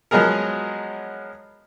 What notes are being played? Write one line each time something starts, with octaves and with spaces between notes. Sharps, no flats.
F3 F#3 G#3 B3 G#4 A#4